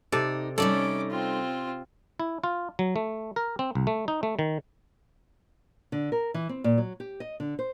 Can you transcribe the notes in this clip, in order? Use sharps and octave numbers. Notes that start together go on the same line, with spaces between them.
C3 D#4 A4 D5
G3 A3 C#4 D#4 A4 D5 D6
C4 F4
E4
F4
F#3
A3
A#4
C4
C2
A3
D#4
A3
D#3
D3
A#4
E3
C4
A#2
F#3
G4
D#5
D3
C5